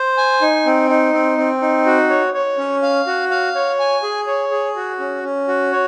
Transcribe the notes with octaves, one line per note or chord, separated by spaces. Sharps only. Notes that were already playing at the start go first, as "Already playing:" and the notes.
Already playing: C5
G#5
D#4
C4
D#4
C4
C4
D#4
F#4
C#5
C#5
C#4
F5
F#4
F5
C#5
G#5
G#4
C#5
G#4
F#4
C#4
C#4
F#4
C#5